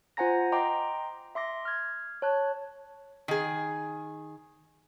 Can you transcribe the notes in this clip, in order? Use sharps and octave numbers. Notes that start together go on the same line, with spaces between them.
F4 C5 F#5 G#5 A#5 A#6
D#5 G5 A#5 C6 D6
E5 C6 D6 A#6
F6 G#6
C#5 A5 F#6
D#3 G#4